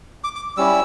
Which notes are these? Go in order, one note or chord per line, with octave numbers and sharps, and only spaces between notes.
D6
D6
G3 C#4 E4 E6